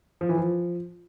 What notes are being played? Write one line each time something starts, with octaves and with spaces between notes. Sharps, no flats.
F3
E3
F3